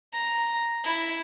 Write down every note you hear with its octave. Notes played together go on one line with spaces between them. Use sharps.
A#5
E4